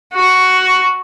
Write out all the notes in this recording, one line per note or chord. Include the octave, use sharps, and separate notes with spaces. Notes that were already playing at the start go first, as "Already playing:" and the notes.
F#4